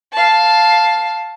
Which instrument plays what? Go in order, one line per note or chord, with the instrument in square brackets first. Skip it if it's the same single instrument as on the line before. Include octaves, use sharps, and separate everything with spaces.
[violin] F5 A5